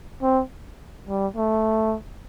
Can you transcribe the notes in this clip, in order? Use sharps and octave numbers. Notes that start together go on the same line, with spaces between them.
C4
G3
A3